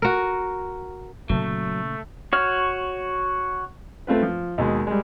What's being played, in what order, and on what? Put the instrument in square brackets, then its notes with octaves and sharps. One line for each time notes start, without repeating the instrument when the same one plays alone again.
[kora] F#4 A#4
[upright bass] A#2 C#3 [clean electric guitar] F#3 [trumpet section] A3
[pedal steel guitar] F#4 C#5 F6
[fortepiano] A3 C4 F4 B4
F3
D#2 B2 G#3
G3 G#3